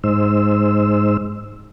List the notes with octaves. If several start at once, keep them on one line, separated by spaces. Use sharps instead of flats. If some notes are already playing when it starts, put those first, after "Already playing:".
G#2 G#3 D#4 C5 E6